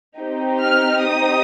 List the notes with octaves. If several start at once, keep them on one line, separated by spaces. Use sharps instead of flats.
C4 D#4 G4
F6
D#6